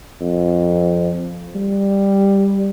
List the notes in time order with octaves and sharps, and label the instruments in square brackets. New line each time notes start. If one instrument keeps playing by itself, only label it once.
[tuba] F2
G3